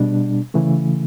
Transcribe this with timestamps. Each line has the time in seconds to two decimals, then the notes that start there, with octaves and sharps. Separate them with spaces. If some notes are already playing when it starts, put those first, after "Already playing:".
Already playing: B2 G3 D4
0.54 C#3 E3 A3